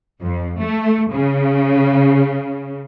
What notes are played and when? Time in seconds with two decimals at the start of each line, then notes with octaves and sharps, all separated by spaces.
0.24 F2
0.61 A3
1.15 C#3